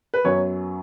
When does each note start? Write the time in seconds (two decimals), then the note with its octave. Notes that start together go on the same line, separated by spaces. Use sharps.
0.14 B4
0.24 F#2 F#3 B3 C#5